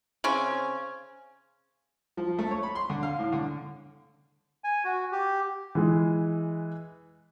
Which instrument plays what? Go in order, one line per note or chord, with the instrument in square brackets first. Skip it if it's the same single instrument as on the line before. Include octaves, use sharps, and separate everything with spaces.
[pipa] C#3 C4 C#4
[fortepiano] F3
A3
C#5
B5
C6
D3
F5
A2
D3
[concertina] G#5
F#4
G4
[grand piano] E3 G#3